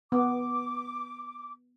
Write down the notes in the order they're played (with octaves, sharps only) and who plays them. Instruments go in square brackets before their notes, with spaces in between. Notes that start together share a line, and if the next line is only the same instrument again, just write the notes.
[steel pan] B3 [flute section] D6